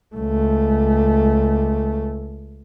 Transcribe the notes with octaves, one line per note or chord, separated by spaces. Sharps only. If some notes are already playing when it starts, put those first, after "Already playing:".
C#2 A3